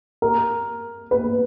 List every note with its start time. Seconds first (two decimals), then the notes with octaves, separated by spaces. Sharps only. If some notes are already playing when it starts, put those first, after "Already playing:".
0.22 A#4
1.11 B4